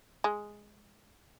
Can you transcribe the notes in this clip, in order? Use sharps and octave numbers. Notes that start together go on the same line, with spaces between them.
G#3